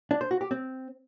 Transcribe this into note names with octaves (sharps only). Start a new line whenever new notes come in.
D4
C5
F#4
G4
C4